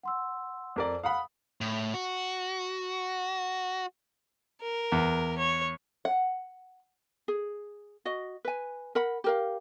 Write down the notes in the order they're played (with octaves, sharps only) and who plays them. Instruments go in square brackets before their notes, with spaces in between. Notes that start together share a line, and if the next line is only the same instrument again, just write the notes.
[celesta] F#5 C6 E6
[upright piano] F2 A#4 D5
[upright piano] F5 F#5 B5 [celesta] D#6
[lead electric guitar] A2
F#4
[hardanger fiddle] A#4
[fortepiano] E2
[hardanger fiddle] C#5
[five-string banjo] F#5
[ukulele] G#4
F#4 D#5
B4 G#5
A#4 F#5 B5
G4 A#4 F5